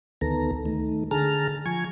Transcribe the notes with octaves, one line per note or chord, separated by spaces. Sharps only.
D2 D#3 B3 A4 A#5
D#3 A3
D3 G#4 A5 A#5 F6
F3 G#5 C#6 G#6